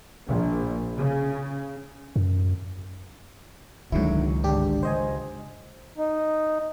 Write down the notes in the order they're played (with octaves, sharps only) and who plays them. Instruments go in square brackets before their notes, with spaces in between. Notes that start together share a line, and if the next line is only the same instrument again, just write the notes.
[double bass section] A#1
C#3
[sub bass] F#2
[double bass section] C#2 [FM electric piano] G#2 D3 E4 [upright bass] D#3 G#3 [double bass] F#3
[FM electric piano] G1 D4 G4 [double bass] G#2 D3
[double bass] C#2 C#3 [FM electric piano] C5 D#5 G#5
[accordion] D#4